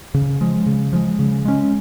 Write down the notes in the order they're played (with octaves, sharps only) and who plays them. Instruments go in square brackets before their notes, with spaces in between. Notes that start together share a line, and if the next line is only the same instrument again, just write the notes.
[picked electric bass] C#3
F3 G#3
C#3
F3 G#3
C#3
G#3 C#4